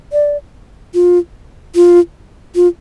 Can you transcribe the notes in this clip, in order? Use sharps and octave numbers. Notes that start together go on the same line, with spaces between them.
D5
F4
F4
F4